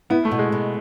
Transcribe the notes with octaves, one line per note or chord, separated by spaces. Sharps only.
B3 E4
A3
B2
G#3
B2